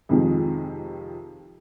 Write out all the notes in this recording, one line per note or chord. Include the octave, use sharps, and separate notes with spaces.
F2 C3 D#3 F3 G#3